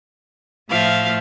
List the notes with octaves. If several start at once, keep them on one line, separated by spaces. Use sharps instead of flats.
A2 F3 E5 F5